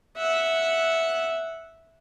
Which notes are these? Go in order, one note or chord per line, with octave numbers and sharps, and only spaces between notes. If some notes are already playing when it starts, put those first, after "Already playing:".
E5 F#5